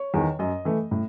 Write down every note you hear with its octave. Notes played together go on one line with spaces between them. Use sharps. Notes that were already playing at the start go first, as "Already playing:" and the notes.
Already playing: C#5
E2 D#3
F#2 D#5
E3 A3
A2